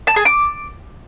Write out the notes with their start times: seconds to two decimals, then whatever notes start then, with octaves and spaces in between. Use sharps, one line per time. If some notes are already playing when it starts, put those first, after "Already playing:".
0.07 A5
0.16 G#4
0.25 D6